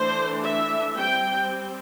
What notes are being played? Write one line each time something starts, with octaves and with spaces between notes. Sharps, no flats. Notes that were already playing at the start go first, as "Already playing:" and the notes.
Already playing: E3 A3 D4 C5
E5
G3 C4 G5